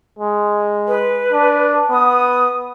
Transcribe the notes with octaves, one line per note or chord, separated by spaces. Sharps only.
G#3
B4
D4
B3 D#6